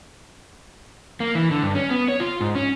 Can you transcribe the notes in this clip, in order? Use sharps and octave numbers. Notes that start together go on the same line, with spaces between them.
A#3
E3
D3
G2
C#4
B3
C#5
F4
G#2
C#4